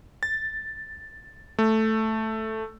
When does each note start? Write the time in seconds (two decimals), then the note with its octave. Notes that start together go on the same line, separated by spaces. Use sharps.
0.23 A6
1.59 A3